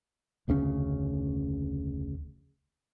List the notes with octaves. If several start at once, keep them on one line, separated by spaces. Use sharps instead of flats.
F1 D2 C#3 C#4